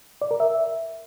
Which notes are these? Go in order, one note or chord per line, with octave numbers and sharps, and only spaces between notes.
D5
A#4
E5